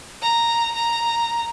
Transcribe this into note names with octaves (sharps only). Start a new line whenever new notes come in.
A#5
A#5